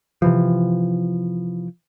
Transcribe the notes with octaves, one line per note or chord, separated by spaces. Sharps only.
C3 E3 F3